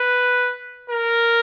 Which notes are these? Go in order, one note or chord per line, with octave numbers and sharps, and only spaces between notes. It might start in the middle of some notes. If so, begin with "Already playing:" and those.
Already playing: B4
A#4